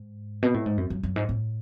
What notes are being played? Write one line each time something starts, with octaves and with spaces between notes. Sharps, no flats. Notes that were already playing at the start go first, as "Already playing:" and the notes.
Already playing: G#2
B2
A2
G#2
F#2
F#2
F#2
G#2
A2